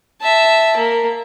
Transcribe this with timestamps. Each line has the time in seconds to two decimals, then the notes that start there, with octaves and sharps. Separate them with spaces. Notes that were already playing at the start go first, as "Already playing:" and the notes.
0.21 E5 A5
0.77 A#3